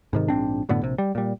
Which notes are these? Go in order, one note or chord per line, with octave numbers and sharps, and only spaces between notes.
G#2 C3 D#3
A#1 G#2 C4 D4
F#2 A2 D3 B3
A#1 C3
G3
A#2 G3